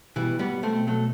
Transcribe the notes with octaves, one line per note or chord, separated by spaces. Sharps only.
B2 E3 G3
G3 B3
A3 C4
F#3 A3